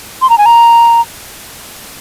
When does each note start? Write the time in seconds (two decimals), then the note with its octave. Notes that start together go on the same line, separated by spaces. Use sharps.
0.22 C6
0.30 A#5
0.38 G#5
0.46 A#5